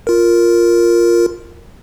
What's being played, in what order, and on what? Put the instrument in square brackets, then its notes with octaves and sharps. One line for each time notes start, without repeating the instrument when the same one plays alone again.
[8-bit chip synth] F4 A#4